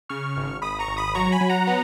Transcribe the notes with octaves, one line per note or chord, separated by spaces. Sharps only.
C#3 C#6 F6
G#1
G#1 B5 D#6
A#5 C#6
G#1
B5 D#6
F#3 A#5 C#6
G#5 B5
F#3
F#5 A#5
B3